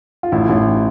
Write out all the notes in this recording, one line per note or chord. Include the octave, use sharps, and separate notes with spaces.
F4
A1 E4
A1